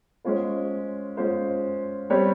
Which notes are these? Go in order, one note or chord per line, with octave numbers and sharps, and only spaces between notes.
G#3 C#4 F4 C5
G#3 C#4 F4 C5
G3 C4 G4 C#5